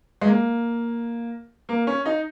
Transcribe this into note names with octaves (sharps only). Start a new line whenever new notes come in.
G#3
A#3
A#3
C#4
D#4